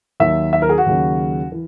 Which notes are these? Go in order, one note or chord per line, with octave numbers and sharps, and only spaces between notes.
D#2 D#3 F#3 E5
E5
A#4
G#4
F#4
D#2 C#3 F#3
E3